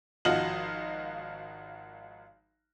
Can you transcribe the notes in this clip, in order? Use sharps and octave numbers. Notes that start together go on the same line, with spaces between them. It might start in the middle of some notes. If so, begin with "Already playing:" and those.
G#1 F3 F#4 D#5 F5 F#7